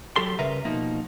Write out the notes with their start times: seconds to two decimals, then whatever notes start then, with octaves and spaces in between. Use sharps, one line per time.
0.16 F#3 G4 A4 C6
0.39 C#3 G3 A#4 B4 E5 A#5
0.65 B2 F3 A#3 D#4